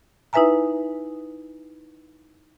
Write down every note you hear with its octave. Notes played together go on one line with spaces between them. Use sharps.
D#4 E4 B4 E5 G#5 A#5